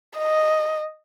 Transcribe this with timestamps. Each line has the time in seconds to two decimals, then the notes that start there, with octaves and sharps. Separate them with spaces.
0.18 D#5